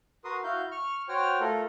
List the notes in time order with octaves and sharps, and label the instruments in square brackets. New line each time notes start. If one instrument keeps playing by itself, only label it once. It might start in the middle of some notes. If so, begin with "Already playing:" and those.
[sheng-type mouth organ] F#4 A#4 B4 C6 D#6
E4 F#4 F5 G6
C#6 F6
F#4 C5 C#5 G5 F6
A3 F4 A4 A#4